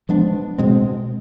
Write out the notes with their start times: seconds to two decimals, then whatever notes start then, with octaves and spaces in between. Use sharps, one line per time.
0.09 F3 G#3 B3 D4
0.58 B2 G#3 C4